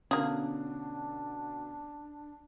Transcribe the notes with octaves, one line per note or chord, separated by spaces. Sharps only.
B2 D3 A#3 C#4 D4 G#4